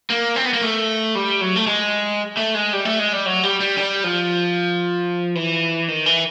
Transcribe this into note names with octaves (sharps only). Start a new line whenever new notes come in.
A#3
C4
B3
A#3
A3
G3
F#3
A3
G#3
A3
G#3
G3
A3
G#3
G3
F#3
G3
G3
G3
F3
E3
D#3
E3